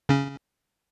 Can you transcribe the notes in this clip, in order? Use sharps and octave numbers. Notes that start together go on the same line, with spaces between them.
C#3 C#4